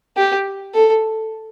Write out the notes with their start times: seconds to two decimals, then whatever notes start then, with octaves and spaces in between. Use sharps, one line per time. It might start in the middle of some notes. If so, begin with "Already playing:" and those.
0.17 G4
0.75 A4